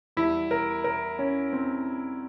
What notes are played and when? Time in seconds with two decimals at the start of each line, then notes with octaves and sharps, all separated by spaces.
0.17 E2 E3 G3 E4
0.51 A#4
0.84 A#4
1.19 C#4
1.53 C4